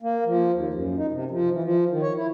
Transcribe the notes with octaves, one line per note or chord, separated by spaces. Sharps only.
A#3
F3
D#2
F#2
D#4
C3
F3
E3
F3
D#3
C#5
E4